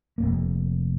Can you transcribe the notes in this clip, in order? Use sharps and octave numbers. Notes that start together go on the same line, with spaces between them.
F1 F#2 A#3